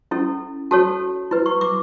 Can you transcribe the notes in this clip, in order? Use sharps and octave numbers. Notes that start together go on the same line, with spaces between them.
C#4 E4 A4
F#4 A4 C#5 A5
E4 B4
C#6
D6